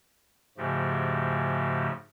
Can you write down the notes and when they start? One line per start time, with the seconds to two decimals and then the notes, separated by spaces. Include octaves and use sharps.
0.58 G#2 C#3 F3 A3 F#4 G4